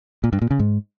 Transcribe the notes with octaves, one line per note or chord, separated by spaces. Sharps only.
A#2
G2
A#2
C#3
G#2